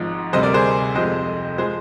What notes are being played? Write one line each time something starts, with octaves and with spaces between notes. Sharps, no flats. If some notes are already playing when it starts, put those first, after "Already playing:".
Already playing: G#1 G#2 F3 G#3
D2 C3 G3 C5 D#5
A#4 D5
G#4 C5
F2 C3 F3 G#3 C5 D#5
F3 G#3 G#4 C5